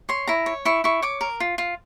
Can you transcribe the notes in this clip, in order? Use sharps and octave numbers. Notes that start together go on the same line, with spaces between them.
C#5 C6
E4 A#5
C#5
E4 C#6
E4 C#6
C#5 D6
A#4
F4
F4